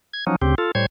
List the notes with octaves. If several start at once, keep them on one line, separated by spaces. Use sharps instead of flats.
G#6
F3 F#3 C#4 D#4
D2 C#3 C4 G4
F4 A4
A2 G3 C5 C#5 G#6